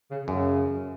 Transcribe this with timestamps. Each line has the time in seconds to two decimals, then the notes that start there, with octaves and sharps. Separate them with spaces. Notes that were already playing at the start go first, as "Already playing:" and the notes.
0.11 C#3
0.28 F#2 C#3